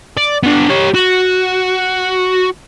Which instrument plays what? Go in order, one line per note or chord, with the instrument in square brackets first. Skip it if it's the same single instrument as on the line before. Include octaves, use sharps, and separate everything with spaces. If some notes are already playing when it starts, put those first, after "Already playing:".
[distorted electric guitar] D5
B3 D4
G4 C#5
F#4